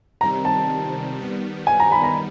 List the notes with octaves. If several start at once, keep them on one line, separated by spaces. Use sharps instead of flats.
C3 D#3 G3 C4 A#5
A5
D#3 G3 B3
G#5
A#5
B5
A#5